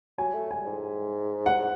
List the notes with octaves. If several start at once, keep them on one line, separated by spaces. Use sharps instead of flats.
F#3 G#5
A3
G#5
G#2
F#5